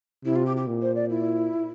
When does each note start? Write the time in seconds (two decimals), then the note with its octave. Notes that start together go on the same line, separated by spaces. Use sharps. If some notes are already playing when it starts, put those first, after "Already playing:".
0.25 C3 E4
0.35 F4
0.45 G4
0.56 G4
0.67 A#2
0.81 C5
0.95 D5
1.09 E4